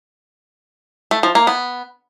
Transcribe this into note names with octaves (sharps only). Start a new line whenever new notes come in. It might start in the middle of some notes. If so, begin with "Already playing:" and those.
A3
F3
A#3
B3